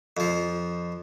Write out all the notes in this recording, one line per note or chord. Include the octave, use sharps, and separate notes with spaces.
F2 F3